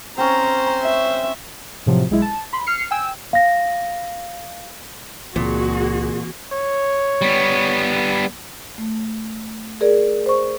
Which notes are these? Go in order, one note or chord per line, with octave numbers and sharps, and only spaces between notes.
C4 C#4 C5 A#5
E5
A2 C3 F3 F#3
B1 G#3 E4
A5
B5 C6
F6 C7 C#7
G5 G#5 E6
F5 A#6
C#2 A#2 E3 A#3 C4 F#4 G#4
C#5
G3 B3
A3
G#4 A#4 D5
C5 C#6